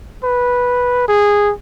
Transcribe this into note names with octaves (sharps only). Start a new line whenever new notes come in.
B4
G#4